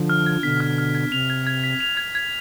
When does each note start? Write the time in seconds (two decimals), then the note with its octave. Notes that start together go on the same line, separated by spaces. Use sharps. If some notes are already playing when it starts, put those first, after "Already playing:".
Already playing: D3 F3
0.10 F6
0.26 G#6
0.43 B2 D3 B6
0.60 F6
0.78 F6
0.95 G#6
1.12 C3 F7
1.30 G#6
1.47 G#6
1.64 B6
1.81 F7
1.97 G#6
2.15 G#6